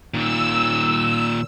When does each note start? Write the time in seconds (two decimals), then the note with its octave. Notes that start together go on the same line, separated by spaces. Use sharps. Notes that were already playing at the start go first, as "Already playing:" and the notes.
0.14 A#2 D#3 E6